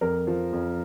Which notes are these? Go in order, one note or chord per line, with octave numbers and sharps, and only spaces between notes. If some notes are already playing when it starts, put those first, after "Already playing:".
F2 A#4
F3
F2